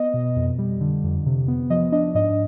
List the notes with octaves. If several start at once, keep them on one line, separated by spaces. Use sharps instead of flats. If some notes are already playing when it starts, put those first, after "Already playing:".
Already playing: B3 D#5
B2
F2
G3
D3
F2
C3
B3
F3 D#5
D4 D#5
G#2 D#5